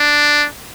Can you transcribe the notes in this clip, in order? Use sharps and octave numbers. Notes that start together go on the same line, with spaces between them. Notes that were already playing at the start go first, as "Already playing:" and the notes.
Already playing: D4